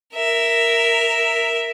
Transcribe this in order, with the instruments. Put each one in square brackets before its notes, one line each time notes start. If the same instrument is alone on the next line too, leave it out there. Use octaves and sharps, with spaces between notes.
[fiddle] A#4 E5